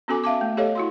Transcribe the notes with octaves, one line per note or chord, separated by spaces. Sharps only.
B3 C#4 F#4 A4 G#5 D6
E5 F5 A5 D6
A3
G4 A4 C#5 D#5 F5
E4 F#4 C6